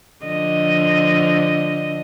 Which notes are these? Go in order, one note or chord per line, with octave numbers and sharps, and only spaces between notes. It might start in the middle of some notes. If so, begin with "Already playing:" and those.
D3 F3 D#5